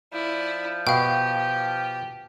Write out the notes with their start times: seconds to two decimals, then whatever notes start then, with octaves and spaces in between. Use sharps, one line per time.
0.13 F3 E4 D5
0.87 B2 G4 F5 G5